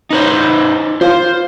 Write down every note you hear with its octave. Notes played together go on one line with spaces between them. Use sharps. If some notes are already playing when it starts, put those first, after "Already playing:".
D#4 B4 C5
F4 C5